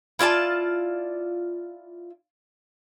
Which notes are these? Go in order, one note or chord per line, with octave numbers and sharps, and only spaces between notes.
E4 F4 D5 A5